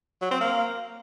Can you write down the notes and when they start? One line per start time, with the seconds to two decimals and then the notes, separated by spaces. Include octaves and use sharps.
0.22 F#3
0.31 C4
0.41 A#3